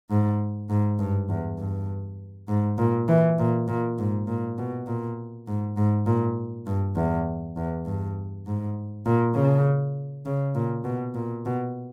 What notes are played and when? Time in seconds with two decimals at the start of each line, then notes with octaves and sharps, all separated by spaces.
0.10 G#2
0.70 G#2
0.99 G2
1.29 E2
1.58 G2
2.48 G#2
2.78 A#2
3.08 E3
3.39 A#2
3.68 A#2
3.99 G#2
4.27 A#2
4.58 B2
4.87 A#2
5.47 G#2
5.77 G#2
6.06 A#2
6.67 G2
6.96 E2
7.57 E2
7.86 G2
8.46 G#2
9.06 A#2
9.35 C#3
10.26 C#3
10.55 A#2
10.84 B2
11.15 A#2
11.45 B2